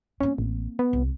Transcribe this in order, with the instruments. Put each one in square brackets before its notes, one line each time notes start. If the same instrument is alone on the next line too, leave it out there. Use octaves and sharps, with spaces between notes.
[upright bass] A#3 C4 [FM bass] C#4
[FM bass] A1
B3
[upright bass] C2